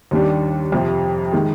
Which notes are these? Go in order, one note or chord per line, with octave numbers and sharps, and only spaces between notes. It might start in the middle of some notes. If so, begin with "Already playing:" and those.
D#2 D#3 G3 D4
F2 C3 F3
D#3 G#3